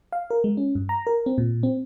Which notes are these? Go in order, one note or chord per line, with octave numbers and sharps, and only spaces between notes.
F5
A#4
G#3
C#4
G2
A#5
A#4
C4
A#2
C4